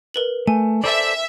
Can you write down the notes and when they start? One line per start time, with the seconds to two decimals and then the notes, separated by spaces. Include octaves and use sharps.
0.14 A#4 B4 F#7
0.47 A3 G#5
0.84 A4 C5 D5 E5